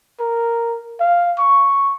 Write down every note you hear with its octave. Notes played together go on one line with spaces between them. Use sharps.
A#4
F5
C#6